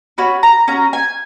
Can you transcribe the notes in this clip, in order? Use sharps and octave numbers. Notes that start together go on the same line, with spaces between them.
C#4 F#4 B5
A#5
C#4 F#4 A#5
G#5